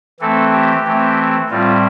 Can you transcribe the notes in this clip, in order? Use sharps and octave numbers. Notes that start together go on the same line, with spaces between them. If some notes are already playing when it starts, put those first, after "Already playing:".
E3 A3 C4 A4
G4
E3 A3 C4
A2 G3 C4 F4